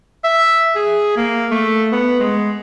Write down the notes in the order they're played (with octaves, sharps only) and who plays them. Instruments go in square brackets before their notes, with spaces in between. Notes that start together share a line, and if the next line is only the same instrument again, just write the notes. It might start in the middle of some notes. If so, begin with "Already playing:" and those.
[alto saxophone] E5
G#4
A#3
A3
B3
G#3